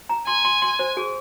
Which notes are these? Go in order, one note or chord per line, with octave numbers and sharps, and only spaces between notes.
A#5
G#5 C6
C6
C6
C5
G#4